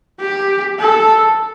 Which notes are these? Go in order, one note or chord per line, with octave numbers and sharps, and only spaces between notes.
G4
A4